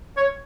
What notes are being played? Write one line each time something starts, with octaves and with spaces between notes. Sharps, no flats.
C#5